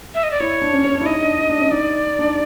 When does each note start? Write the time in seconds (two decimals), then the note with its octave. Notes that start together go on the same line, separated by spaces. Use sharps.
0.15 E5
0.23 D#5
0.31 D5
0.40 E4 C#5
0.62 D4
0.73 C#4
0.84 C#4
0.95 D4
1.01 E4
1.06 D#4 D#5
1.22 D4
1.39 D#4
1.49 D4
1.60 C#4
1.71 D#4 D5
2.19 D4
2.28 D#4